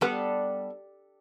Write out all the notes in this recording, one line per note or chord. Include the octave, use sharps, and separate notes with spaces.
G3 B3 D4 A4